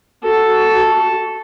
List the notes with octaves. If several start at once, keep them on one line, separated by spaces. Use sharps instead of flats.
F#4 A4